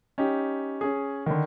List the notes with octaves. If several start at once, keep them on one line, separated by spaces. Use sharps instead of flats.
C#4 D#4 G4
C#4 G#4
D3 D#3